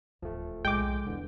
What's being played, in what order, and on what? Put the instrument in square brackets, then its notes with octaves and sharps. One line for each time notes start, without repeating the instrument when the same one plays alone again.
[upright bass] D1 D#2 [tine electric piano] F3 A3
[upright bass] B1 A2 [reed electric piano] G#3 [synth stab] G5 D6
[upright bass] E2 G3 [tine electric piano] D3 E3